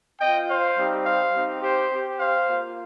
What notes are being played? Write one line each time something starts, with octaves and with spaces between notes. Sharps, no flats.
C4 F4 D#5 G5
C5 F5
G3 C4 D#4 G4
C5 F5
C4 D#4 G4
G4 C5
C4 G4
C5 F5
A#3 F4